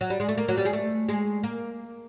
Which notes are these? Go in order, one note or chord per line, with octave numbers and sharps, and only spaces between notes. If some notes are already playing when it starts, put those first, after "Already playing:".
F#3
G3
G#3
A3
A#3
F#3
G3
G#3
A3
G#3
A#3